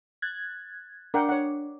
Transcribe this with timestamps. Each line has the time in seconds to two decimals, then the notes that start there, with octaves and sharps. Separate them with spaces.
0.22 F#6 G#6 A6
1.14 D4 A#4 F#5 G5
1.29 C#5 F#5